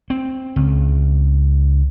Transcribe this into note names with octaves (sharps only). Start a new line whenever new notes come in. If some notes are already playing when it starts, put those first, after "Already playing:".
C4
C#2